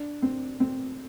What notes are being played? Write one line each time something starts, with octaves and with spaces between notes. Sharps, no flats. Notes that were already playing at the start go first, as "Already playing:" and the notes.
Already playing: D4
C4
C4